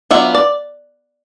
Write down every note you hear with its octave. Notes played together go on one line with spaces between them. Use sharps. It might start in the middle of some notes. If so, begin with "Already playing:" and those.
F#3 B3 D4 F4 E5
D5